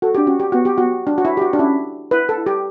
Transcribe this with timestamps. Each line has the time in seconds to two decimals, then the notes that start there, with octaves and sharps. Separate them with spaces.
0.02 F#4 A4
0.15 D4 G4
0.27 C#4 F#4
0.40 G4
0.52 B3 F#4
0.65 G4
0.78 F#4
1.07 D4
1.18 F#4
1.25 E4
1.37 G4
1.42 F#4
1.53 D4
1.59 C#4 E4
2.11 E4 B4
2.29 A4
2.37 E4
2.46 G4